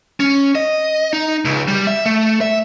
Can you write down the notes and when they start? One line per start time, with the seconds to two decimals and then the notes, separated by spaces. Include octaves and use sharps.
0.20 C#4
0.55 D#5
1.13 D#4
1.45 C#2
1.68 G3
1.87 E5
2.06 A3
2.41 E5